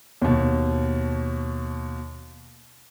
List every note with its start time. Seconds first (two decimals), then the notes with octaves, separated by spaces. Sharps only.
0.22 D#2 B2